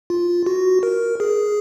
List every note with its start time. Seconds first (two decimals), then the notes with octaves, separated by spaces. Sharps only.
0.10 F4
0.46 F#4
0.83 A#4
1.20 G#4